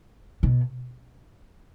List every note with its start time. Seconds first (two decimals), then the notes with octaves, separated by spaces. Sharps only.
0.43 B2